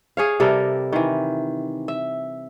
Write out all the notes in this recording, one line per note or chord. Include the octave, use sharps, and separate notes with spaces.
G#4 C#5 F5
C3 G3 A4 A#4
D#3 E3
E5